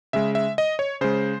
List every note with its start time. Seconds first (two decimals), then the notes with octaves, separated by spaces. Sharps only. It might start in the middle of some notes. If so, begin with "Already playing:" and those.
0.13 C#3 G#3 E5
0.35 E5
0.58 D#5
0.79 C#5
1.01 C#3 G#3 C5